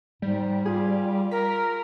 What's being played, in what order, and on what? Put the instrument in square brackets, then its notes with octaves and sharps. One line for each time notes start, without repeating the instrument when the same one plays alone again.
[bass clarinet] G#2 [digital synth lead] G3
[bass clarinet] F4 [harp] G#4
[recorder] A#4 [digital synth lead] B6